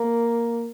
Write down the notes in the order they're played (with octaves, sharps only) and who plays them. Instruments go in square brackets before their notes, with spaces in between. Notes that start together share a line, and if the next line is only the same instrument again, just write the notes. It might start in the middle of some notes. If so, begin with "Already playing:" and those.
Already playing: [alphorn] A#3